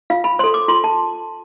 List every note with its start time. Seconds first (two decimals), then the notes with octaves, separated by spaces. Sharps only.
0.10 F4 F5
0.24 B5
0.39 A4 C5 C6
0.54 D6
0.68 F4 C6
0.84 A5